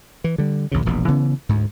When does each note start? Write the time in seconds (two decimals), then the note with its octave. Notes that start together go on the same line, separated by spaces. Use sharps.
0.24 E3
0.38 D3 G3
0.71 A#1 D#2 A#2 C#3
0.86 E1 A#1 B2
1.08 C#3 E3 B3 C#4
1.49 D2 G#2